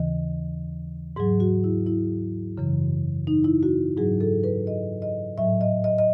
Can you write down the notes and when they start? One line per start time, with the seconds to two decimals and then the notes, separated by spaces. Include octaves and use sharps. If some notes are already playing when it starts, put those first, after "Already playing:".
Already playing: D#2 C#3 E3 D#5
1.16 G#2 F#3 G#4
1.40 F#4
1.64 E4
1.86 E4
2.57 F#2 C#3 E3
3.27 D#4
3.44 E4
3.63 F#4
3.97 G#2 F#3 G#4
4.20 A4
4.44 B4
4.67 D#5
5.02 D#5
5.38 A2 F#3 E5
5.61 D#5
5.84 D#5
5.98 D#5